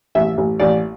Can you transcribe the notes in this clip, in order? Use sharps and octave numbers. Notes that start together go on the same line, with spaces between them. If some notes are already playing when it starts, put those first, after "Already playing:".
A1 E5
A1
A1 D5